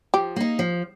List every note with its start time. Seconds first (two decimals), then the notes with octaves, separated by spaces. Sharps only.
0.14 F3 G4
0.36 A#3 D#4
0.59 F3